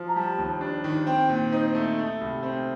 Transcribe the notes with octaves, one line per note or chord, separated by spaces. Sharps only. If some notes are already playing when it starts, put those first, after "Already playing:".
Already playing: F3
A#5
G3 A5
D#2
D4
D#3
C4 G5
A#2
D#4 C5
A3
A3
C2
C4